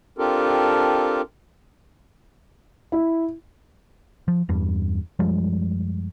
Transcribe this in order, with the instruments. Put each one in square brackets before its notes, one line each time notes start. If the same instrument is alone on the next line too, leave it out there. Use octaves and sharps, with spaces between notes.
[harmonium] C4 D4 F4 G4 A4 A#4
[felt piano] E4
[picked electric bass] F3
E2 G2
F#2 F3 G3 G#3